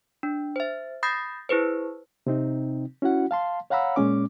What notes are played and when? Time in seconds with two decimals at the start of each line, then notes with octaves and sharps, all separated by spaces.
0.23 D4
0.56 C5 E5
1.03 B5 D#6 G6 A6 A#6 C7
1.49 E4 G#4 B4 C5
2.27 C3 C4 D#4
3.02 C#4 E4 F#4 F#5
3.31 F5 A5 C6
3.70 C#5 F5 F#5 A#5 B5 E6
3.96 A#2 G#3 C#4 D6